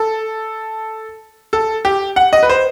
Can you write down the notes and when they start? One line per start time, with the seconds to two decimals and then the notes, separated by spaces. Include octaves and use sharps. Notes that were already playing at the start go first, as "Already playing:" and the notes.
Already playing: A4
1.53 A4
1.85 G4
2.16 F#5
2.33 D#5
2.43 B4
2.49 C5